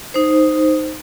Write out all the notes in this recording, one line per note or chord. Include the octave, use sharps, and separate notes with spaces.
D#4 C5